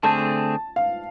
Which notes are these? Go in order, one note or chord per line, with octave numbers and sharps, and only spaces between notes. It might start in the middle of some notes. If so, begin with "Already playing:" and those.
D3 A3 C4 G#4 A5
F5